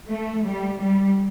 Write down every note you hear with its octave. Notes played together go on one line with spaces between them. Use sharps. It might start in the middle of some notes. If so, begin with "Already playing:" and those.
A3
G3
G3